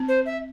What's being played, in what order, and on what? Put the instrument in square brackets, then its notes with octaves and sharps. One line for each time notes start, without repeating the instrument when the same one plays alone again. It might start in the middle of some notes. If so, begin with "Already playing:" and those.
Already playing: [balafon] C4
[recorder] C5
E5